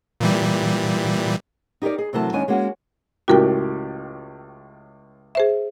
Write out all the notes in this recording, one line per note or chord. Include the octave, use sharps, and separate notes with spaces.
A#2 E3 G3
D#4 G4 G#4 A#4 D5
G#4
C3 E3 F#3 A3 A#4 A5
D#2 G#3 C#4 D4 G#5
G#3 A#3 C#4 F#4
C#2 A2 F#4 G4 A#4 G5
G#4 C5 E5